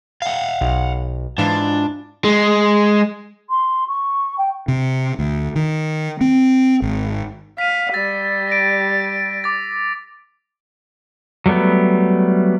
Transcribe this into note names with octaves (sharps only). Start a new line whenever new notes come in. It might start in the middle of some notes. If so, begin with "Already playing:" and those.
F5 F#5
B1
G#2 E3 D4 F4
G#3
C6
C#6
G5
C3
D2
D#3
C4
G#1
F5 B6 D#7
G3 E6 A6
A6 A#6 D7
D6 A6
F#3 G3 A3 B3